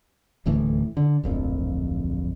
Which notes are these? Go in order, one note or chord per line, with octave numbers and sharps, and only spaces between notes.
D#1 D2 A2 E3
D3
D1 A#1 F2